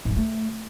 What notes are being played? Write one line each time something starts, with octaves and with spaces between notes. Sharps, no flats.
G#2
G#3
A3